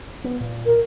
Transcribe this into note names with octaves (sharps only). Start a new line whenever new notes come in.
B3
A#2
A#4